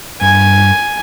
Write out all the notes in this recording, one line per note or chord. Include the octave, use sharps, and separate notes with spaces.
G2 G#5